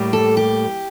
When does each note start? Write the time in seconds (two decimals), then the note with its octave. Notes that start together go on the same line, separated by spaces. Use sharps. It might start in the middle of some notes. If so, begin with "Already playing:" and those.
Already playing: A2 G3 A#3
0.13 A4
0.37 G4